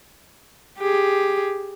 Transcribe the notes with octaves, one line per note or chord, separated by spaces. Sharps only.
G4 G#4